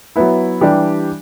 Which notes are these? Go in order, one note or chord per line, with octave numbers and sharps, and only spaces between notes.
F#3 B3 E4
E3 G3 D4 G4